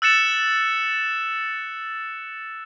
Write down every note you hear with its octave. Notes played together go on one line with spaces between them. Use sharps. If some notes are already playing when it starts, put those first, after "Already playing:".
E6 F#6 A6 C#7 E7